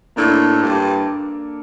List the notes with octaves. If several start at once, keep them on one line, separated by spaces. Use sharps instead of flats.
A2 A#3 D4 A4
G2